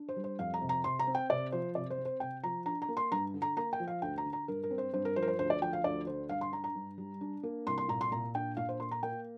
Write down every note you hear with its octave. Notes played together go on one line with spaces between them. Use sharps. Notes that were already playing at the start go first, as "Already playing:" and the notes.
Already playing: D4
C5
G3
C5
F2 F5
A#5
C3
A#5
C3 C6
A#5
C4
G5
C3 D5
F3 C5
C3 D5
C5
C4
C5
C3 G5
F3 A#5
D4 A#5
A#5
A#3
C6
G2 A#5
D3
A#5
A#3 A#5
G5
F3
F5
D2 G5
A#5
D3
A#5
G2 A#4
A#4
C4
C5
G2 C5
A#4
F3 C5
A#4
C5
D2 C5
D5
F3 G5
F5
D2 D5
D3 C5
G2 F5
C6
D4 A#5
A#5
G2
G3
D4
A#3
C2 C6
C6
A#2 A#5
C6
A#2 A#5
D4 G5
A#2 F5
C5
A#3 C6
A#5
A#3 G5